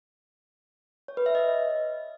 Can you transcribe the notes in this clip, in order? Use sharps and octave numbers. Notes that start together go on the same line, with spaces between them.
C#5
B4
E5
D#5